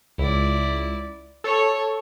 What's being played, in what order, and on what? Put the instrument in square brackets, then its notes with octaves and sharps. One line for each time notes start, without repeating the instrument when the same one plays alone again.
[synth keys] C#2 [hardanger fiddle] E4 D5
[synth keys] A4 C#6 [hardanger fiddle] C#5